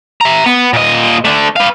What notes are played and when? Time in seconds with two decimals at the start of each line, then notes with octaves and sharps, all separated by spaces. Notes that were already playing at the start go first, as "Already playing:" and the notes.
0.21 E5 A#5
0.46 B3
0.73 A#2 D#5
1.25 A3 D4
1.56 B4 F5